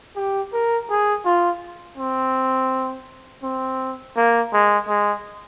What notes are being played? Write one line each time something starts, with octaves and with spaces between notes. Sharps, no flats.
G4
A#4
G#4
F4
C4
C4
A#3
G#3
G#3